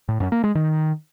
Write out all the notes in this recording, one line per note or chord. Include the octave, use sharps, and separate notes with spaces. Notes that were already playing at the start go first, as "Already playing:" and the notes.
A2
F#2
A#3
G#3
D#3